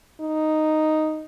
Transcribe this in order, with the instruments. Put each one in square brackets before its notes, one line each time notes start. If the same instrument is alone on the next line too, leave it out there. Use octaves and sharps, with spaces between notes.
[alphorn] D#4